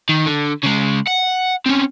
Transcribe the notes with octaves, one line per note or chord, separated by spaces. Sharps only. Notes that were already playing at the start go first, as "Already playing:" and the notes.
D#3
D3
C#3 G#3
F#5
C4 C#4